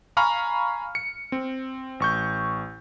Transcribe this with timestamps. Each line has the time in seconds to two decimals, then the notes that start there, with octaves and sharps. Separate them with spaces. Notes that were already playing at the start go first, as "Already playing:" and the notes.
0.17 F5 G#5 A#5 B5 C#6 F6
0.95 C#7
1.32 C4
2.00 A1 C#6 G6